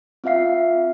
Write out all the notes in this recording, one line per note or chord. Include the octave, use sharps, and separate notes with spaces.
C4 F4 E5 F5 C7